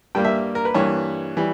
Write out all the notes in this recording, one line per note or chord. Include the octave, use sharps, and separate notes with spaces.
G2 G3 A#3 G5
E5
A#4
B4
G2 E3 A#3 C#5
E3 G3